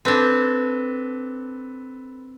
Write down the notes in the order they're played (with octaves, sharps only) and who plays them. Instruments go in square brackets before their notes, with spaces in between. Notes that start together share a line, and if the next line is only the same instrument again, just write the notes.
[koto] C4 D4 [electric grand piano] A4 B4